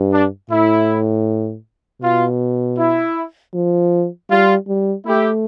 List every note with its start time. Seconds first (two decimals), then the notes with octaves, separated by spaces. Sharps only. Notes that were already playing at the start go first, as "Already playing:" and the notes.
Already playing: G2
0.12 D4
0.50 A2 E4
2.01 B2 F4
2.78 E4
3.54 F3
4.30 G3 F4
4.68 G3
5.05 A3 E4 G4